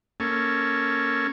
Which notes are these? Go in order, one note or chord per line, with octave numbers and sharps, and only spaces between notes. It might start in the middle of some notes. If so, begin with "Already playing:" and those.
A#3 C#4 A4